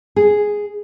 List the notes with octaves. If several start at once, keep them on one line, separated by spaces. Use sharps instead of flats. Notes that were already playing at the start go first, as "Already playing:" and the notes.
G#4